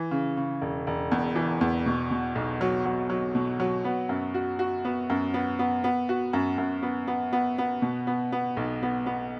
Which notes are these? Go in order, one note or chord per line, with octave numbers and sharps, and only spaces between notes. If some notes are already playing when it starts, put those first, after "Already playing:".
Already playing: E3
C#3
C#3
E1
E1
E2
E3
E2
B2
B2
B1
F#3
F#3
F#3
B2
F#3
B3
F#2
F#4
F#4
B3
F#2
B3
B3
B3
F#4
F#2
F#2
B3
B3
B3
B3
B2
B3
B3
B1
B3
B3